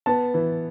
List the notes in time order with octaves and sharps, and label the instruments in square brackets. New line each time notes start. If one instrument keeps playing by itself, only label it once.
[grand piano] B3 A5
E3